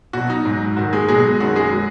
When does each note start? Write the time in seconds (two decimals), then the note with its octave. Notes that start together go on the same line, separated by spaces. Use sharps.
0.13 B2 F#3 F#4
0.30 D#4
0.45 G#2 F#3
0.76 G#2 D#3 F#3 F#4
0.93 G#3 G#4
1.08 B2 F#3 G#3 G#4
1.40 F#2 D#3 F#3 F#4
1.56 G#3 G#4
1.72 F#3